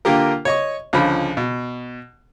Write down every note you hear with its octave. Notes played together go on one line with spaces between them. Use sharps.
D3 A#3 F4 G4 A#4
C#5 D#5 C#6
C#2 D3 F3 B5
B2